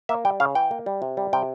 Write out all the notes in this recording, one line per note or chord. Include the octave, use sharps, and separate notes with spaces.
A#3 E5
G3 G5
C#3 F5
E3 G5
A#3
G3
C3
G3
C3 G5